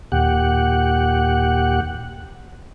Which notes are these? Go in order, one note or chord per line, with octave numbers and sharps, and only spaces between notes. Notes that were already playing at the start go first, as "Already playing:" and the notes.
D#2 A#2 G4 F#5